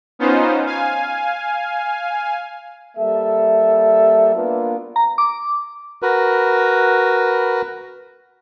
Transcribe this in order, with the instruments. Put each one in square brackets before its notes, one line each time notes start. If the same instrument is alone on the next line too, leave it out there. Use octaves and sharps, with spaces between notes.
[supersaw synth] B3 C#4 D#4 F4 C5
F5 G#5
[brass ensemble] G3 A#3 A4 E5
A#3 B3 D4 F4 B4 F5
[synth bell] A#5
D6
[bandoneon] F#4 A#4 B4